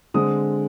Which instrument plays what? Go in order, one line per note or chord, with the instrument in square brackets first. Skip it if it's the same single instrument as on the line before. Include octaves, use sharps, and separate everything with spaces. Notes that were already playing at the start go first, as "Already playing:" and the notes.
[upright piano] D3 G#3 C4 D#6